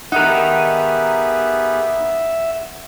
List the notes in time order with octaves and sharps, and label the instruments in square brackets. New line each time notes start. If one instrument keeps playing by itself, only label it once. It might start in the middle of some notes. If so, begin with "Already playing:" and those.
[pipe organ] B3 G4 G#4 [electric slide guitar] D#4 A#4 [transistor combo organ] E5 [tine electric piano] F#5